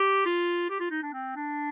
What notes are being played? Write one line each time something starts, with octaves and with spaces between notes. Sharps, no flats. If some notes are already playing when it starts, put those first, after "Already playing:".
Already playing: G4
F4
G4
F4
D#4
D4
C4
D4